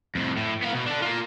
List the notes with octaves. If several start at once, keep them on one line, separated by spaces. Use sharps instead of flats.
F2 A2
A2
B3 F5
B2
D4 A4
A#3 F4